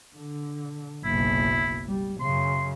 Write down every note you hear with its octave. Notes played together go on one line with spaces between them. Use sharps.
D3
F#1 B1 E4
G3
F#2 C#3 C6